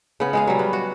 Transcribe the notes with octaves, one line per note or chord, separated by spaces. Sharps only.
C#3 B3
G#3 G#4 F5
F#3 G3
B3
F#4